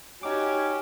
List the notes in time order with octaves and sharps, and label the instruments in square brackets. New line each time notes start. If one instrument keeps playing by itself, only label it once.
[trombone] C#4 [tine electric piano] D#4 D6 [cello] F#4 G4 [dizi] C#5